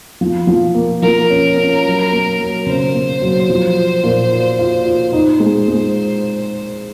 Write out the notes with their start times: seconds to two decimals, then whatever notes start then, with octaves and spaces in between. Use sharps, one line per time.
0.21 F3
0.47 F3
0.74 A#3
1.02 F3 A#4
1.30 C#4
1.57 C#4
1.85 F#3
2.12 A#3
2.39 F#3
2.66 C#3 C5
2.94 A#3
3.21 F#3
3.49 F3
3.76 F4
4.04 A#2
4.31 F4
4.59 F4
4.85 F4
5.13 D#4 C5
5.40 G#3
5.68 G#3